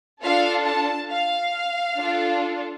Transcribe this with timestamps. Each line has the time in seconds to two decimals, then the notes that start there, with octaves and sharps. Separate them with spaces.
0.22 D4 F4 A4 F5
0.66 A5
1.10 F5
1.97 D4 F4 A4